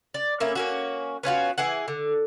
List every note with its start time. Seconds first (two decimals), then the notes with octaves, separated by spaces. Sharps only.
0.14 D5
0.40 A#3 C#4 E4 E5
0.55 A#3 C#4 F#4
1.23 B3 C#4 F4 F#4
1.58 E3 G#4 F#5
1.88 D3